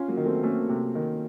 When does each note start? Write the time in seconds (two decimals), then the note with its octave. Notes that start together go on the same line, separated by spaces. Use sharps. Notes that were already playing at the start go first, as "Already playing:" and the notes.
Already playing: C#4 F4
0.08 F#3 A#3
0.17 D#3
0.26 A3 C4
0.43 A3 A#3 C#4
0.69 C3
0.95 D#3